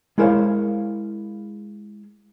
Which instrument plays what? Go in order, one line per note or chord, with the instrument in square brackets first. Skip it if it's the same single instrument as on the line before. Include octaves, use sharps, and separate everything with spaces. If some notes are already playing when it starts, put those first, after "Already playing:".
[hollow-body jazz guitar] G#3 E4 A#4 C5 C#5 F5